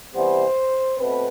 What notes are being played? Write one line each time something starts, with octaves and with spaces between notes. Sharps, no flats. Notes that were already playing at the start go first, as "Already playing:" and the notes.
C3 E3 G3 B3 C5
B2 A3 C4 B4